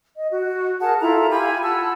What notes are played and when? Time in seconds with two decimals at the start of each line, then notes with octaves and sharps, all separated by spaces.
0.17 D#5
0.30 F#4
0.81 G#4 A#4 F#5 A5
1.00 E4 F4 A4 A#5
1.30 F4 G4 G#5 B5
1.62 F#5 A5 E6